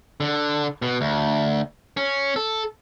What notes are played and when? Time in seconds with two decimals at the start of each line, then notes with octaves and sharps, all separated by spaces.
0.20 D3
0.82 B2
1.01 D2
1.97 C#4
2.36 A4